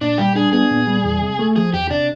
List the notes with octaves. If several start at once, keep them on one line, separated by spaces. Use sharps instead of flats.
A#2 D4
G3 G4
D4 G#4
B3 G#4
A#2
G3
E2
C3
A3
F3 G#4
E2 G4
C3 D4